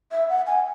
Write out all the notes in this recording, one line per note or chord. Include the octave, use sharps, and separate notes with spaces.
E5
F#5
G#5